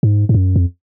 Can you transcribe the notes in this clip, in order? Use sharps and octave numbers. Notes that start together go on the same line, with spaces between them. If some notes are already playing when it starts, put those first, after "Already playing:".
G#2
G#2
F#2
F2